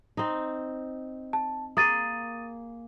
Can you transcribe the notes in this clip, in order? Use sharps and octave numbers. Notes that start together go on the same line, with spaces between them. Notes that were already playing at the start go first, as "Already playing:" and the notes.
C4 D#4
A5
A#3 G#4 D#6 A6 D#7